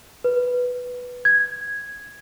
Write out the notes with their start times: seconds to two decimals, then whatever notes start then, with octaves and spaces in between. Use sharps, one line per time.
0.24 B4
1.25 G#6